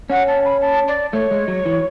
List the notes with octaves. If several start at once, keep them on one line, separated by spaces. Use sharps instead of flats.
C#4 F#5
A5
B5
A5
D5
A3 C#5
G#3
F#3
E3